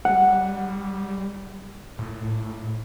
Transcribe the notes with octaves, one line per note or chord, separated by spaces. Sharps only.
G3 F#5
A2